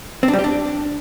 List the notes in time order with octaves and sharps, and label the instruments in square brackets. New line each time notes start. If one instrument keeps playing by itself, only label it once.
[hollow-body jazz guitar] C4
D4
G3
G4
D4